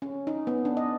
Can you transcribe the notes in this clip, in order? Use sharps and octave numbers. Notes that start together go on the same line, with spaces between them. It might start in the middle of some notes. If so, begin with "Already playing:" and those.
C#4
D#4
B3
D4
D#5